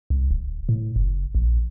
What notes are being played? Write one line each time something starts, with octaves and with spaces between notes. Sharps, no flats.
C2
D1
A2
F#1
A#1